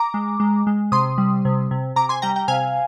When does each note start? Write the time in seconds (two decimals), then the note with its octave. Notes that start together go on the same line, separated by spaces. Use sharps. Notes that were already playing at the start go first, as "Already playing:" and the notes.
Already playing: A#5 D6
0.14 G#3
0.40 G#3
0.67 G#3
0.92 C3 C6 D#6
1.18 G3
1.45 C3
1.71 C3
1.96 C3 A#5 D6
2.09 G#5 C6
2.22 G3 G5 A#5
2.36 G5 A#5
2.48 C3 F5 G#5